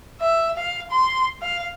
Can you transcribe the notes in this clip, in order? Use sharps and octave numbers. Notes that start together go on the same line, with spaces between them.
E5
F5
C6
F5